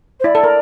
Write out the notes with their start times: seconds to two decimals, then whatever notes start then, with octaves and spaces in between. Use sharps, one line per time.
0.20 C5
0.24 E4 D5
0.35 A4
0.44 A#4